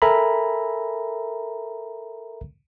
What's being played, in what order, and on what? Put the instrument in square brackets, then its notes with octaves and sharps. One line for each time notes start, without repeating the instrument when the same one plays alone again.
[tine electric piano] A4 A#4 E5 G#5 A#5 B5